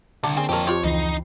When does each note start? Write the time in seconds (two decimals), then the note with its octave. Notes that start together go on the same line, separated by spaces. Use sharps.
0.23 C2 D3 D4 A5
0.37 C#3 A#3 C4 G#5
0.49 F2 C4 G4 A#4 C#5
0.67 C4 F4 G4 C#5
0.84 C#2 E3 D#4 C7